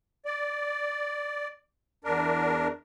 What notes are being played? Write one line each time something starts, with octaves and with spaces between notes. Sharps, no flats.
D5
E2 D4 A#4